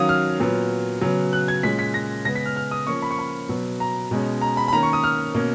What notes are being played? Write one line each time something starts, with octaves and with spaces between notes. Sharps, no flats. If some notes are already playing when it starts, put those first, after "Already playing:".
Already playing: D#3 F#3 C#4 F5 D#6
F6
A#2 F#3 B3
C#3 F#3 B3
F#6
G#6
A#2 G#3 C#4 B6
B6
A#6
C#3 G#3 B3 A#6
B6
F6
F6
D#6
F3 A#3 C#4 C#6
B5
C#6
B5
B2 F#3 B3
A#5
B2 G#3 C#4
A#5
B5
B5
D#3 A#3 C#4 A#5
C#6
D#6
F6
B2 A#3 C#4